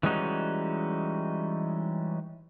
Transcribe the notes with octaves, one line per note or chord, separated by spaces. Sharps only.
E3 G3 G#3 C#4 D#4 F#4